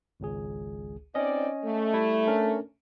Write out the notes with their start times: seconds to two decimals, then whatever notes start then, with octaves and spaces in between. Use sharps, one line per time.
0.20 G#1 C#2 G#4
1.15 C4 C#4 D#4 D5 D#5
1.65 A3
1.94 G3 E4
2.28 C#4 D4 A#4